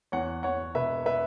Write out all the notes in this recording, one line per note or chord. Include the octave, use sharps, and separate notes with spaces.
E2 C#5 F#5
E2 C#5 F#5
E1 B4 E5
B4 E5